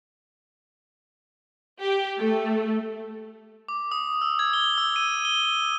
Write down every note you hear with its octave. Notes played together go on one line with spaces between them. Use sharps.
G4
A3
D6
D#6
E6
G#6
G7
E6
D#7
G7
D#7